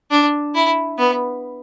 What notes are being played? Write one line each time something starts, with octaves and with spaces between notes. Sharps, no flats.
D4
E4
B3